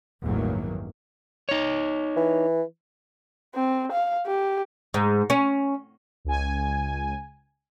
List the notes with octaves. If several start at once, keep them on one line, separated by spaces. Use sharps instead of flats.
A1 E2 G2 D#3 F#3 A#3
D#4 C#5
E3
C4
F5
G4
G#2
C#4
C#2 G#5